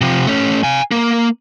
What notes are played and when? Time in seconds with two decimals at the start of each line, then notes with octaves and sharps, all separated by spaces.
0.01 C3 F3
0.27 A3 C#4
0.63 F5 G#5
0.91 A#3